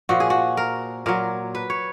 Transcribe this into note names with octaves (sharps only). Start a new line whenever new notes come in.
A#2 F3 F#4
G#4
F#4
A#4
A#2 F#3 A#4
B4
C#5